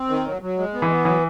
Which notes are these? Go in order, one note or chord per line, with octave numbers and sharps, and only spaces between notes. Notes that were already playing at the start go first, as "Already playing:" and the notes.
Already playing: C4
D#3
F#3
F#3
G#3
B3
E3
B3
E3 F#3